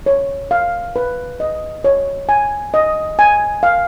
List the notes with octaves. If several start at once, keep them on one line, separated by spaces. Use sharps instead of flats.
C#5
F5
B4
D#5
C#5
G#5
D#5
G#5
F5